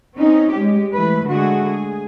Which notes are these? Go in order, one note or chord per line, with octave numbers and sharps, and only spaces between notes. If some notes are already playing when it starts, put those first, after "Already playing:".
C4 C#4 D#4
G#3 G4
E3 A3 B4
D3 G#3 A3 F#4 G#4
G#4